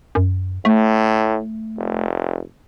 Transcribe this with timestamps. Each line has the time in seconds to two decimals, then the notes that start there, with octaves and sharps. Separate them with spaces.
0.15 F#2
0.65 A2 A3
1.77 F1